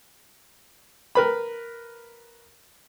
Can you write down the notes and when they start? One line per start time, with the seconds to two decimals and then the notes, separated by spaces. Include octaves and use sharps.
1.15 A#4 B4 B5